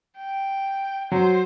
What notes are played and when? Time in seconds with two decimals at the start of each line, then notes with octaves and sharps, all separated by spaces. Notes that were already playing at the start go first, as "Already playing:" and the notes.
0.17 G5
1.12 F#3 C5